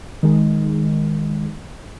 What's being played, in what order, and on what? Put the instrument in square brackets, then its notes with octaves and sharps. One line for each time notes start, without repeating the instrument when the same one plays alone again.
[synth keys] D#3 G#3